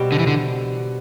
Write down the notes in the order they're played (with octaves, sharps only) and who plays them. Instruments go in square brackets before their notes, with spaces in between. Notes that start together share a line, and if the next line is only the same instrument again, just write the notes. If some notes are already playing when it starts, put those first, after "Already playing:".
Already playing: [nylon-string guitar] B2 G3 C4 G4
[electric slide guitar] D3
E3
D3